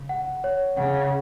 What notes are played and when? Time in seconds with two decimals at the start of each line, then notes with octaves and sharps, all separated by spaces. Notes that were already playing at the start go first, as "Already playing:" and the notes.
Already playing: C#3
0.09 F#5
0.44 C#5
0.77 C#3 F#5